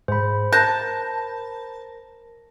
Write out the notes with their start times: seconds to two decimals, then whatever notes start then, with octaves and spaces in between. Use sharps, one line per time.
0.08 G#2 C5 B5
0.52 A#4 A5 F#6 G6 A#6